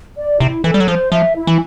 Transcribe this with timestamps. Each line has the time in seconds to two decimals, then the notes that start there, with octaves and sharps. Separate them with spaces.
0.18 D5
0.40 C3 E4
0.64 E3 A4
0.74 G3
0.80 F#3
0.88 F3 C5
1.12 F3 E5
1.36 E4
1.47 E3